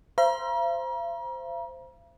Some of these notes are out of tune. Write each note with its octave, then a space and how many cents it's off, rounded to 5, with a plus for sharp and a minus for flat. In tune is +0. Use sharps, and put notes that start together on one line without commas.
C5 +0 F5 -45 A#5 +40